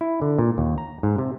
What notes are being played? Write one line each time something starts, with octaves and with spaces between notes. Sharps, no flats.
E4
D3
A#2
D#2
A#5
G#2
C3